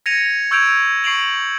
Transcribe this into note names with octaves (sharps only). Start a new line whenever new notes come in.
G#6 A#6 C#7 D#7 F7
C#6 E6 G6 G#6 D7 F7
C#6 C7 D7 F7 F#7